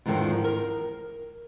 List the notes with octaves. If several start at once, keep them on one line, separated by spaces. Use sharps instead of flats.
E2 G#2 D3 D#3 F3
A#4